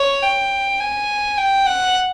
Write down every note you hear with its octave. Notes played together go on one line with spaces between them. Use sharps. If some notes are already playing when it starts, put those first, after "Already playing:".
Already playing: C#5
G5
G#5
G5
F#5